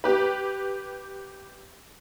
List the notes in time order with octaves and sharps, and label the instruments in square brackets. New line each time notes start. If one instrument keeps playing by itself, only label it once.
[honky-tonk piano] G4 B4